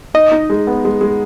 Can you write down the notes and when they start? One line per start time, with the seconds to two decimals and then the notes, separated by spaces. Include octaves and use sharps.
0.14 D#4 D#5
0.32 D#4
0.50 G#3
0.67 B3
0.85 G#3
1.01 G#3